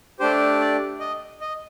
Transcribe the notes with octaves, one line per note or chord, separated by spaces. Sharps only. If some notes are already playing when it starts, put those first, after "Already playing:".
A3 D4 G4 C5
D5
D#5
D#5